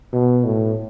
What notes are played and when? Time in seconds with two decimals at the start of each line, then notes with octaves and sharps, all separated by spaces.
0.13 B2
0.45 A2